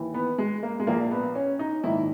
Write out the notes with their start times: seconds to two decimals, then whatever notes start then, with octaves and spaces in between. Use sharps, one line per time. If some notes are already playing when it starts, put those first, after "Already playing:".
Already playing: D#2 E3
0.14 B3
0.38 G#3
0.63 A#3
0.80 G#3
0.87 A#1 A#2 A#3
1.11 B3
1.35 C#4
1.59 D#4
1.83 A#1 G#2 D#3 E4